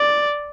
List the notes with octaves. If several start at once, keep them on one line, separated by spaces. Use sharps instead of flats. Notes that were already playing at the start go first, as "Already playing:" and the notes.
Already playing: D5